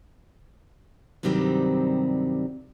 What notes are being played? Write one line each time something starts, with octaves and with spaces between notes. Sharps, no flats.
G2 C3 D#3 F#3 G3 C4